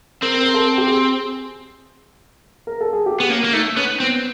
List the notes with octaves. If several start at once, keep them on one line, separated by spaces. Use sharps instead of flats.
C4 A#4
A#4
A4
G4
G#4
A#4
A4
G#4
G4
B3
A#3 C#4
A#3
A3 D#4
B3 C#4
B3 C4